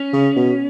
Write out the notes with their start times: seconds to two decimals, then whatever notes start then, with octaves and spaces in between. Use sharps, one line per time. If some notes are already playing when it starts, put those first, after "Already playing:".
Already playing: C#4
0.13 C#3
0.36 B2